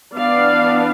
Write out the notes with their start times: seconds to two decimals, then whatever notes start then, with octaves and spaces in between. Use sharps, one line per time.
0.15 E3 B3 D4 D5 F5